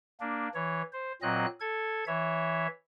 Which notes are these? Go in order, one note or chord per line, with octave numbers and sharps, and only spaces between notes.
A#3 D4
E3 C#5
C5
A#2 F#3 C4 D#5 F#6
A4 G#6
E3 C#5 E5